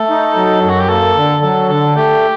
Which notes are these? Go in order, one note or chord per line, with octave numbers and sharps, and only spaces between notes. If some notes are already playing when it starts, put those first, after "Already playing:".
Already playing: A3 A4
D#4
F#3
F#2
F#4
G4
A#3 A4
D3
F#3 A4
D3 A4
A3 G4